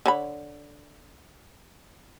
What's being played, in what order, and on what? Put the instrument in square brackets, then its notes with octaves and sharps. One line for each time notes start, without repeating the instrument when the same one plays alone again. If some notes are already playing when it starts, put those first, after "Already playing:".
[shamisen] D3 C#5 B5